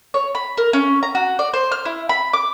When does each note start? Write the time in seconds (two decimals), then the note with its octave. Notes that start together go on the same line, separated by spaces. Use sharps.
0.14 C#5
0.35 B5
0.57 A#4
0.73 C#4
1.03 A#5
1.15 F#4
1.39 D5
1.54 C5
1.72 F6
1.85 E4
2.09 B5
2.33 D6